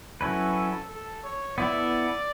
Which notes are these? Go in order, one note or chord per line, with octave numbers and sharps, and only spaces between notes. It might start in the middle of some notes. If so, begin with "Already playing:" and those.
F#3 C#4 E4 A4 B4
A4
C#5
B3 E4 A4 D5 E5